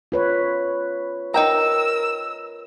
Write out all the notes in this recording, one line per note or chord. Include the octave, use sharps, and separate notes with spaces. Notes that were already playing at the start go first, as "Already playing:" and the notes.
F4 B4 C#5
D#4 A#4 G5 A#5 E6